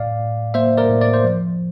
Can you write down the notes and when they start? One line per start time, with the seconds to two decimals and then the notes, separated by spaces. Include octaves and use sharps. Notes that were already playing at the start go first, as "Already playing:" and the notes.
Already playing: A2 D5 F5
0.19 A2
0.54 A#3 C5 E5
0.77 A#4 D5
0.89 A2
1.01 D5
1.13 C5
1.24 F3